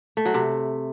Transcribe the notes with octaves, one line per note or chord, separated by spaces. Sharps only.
A3
F#3
C3